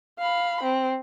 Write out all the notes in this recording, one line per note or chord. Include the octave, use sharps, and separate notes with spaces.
F5 B5
C4